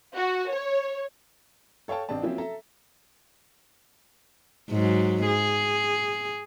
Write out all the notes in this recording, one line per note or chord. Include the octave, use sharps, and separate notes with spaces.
F#4
C#5
A4 C#5 F5 G5 A5
A1 C4 D4 A5
F3 F#3 A#3 C4 C#4 E4
A4 E5 A5 A#5
G#2 F#3
G#4